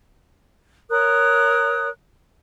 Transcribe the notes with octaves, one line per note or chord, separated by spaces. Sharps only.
A#4 C#5 D#6 F#6